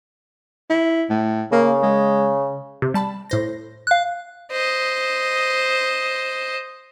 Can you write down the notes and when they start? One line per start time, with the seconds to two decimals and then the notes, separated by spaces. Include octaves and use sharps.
0.70 E4
1.10 A2
1.52 C#3 A#3
1.83 G#3
2.82 C3
2.94 G3 A5 B5
3.30 A2 C5 A#6
3.87 F5 F#6
4.52 C5 D#5